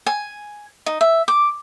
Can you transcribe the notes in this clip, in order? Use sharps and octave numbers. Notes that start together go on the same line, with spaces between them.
G#5
D#4
E5
D6